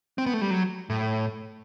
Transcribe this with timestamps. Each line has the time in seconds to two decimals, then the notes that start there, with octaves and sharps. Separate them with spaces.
0.18 C4
0.26 B3
0.34 A3
0.42 G3
0.51 F#3
0.90 A2